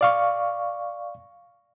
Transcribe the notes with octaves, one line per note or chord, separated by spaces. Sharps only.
D5 F5 C#6